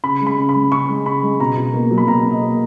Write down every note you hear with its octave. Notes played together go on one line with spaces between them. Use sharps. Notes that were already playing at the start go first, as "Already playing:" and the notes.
C#3 B5
G#3
B5
C#3
B5
G#3
C#3 C#6
G#3
C#3 B5
G#3
B2 A#5
B2
A#3
F#3
B5
B2 A#5
B2
D#5
A#3